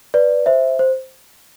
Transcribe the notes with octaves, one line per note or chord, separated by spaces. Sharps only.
B4 D5
C5 E5
C5